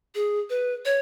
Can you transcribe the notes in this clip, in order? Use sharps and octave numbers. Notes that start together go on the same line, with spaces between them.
G#4
B4
C#5